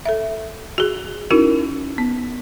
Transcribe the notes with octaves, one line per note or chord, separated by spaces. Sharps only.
A4 E5
F#4 G#4
C#4 D#4 E4 F#4 A#4
B3